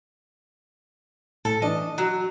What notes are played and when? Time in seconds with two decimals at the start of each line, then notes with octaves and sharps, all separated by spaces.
1.45 A2 A4
1.62 E3 D4 D#5
1.98 F#3 F#4